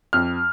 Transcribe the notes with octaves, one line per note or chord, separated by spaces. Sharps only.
F2 F6